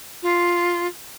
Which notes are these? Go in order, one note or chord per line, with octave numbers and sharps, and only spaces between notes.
F4